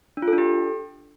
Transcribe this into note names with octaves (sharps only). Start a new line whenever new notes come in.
D4
F4
A4
D4
G4